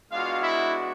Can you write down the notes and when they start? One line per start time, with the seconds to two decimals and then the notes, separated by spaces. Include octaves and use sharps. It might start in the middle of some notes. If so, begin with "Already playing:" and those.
0.11 G#3 B3 D4 F4 F#4 F5
0.41 E4 E5